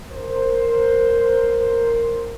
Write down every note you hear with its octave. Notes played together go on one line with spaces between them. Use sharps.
A#4 C5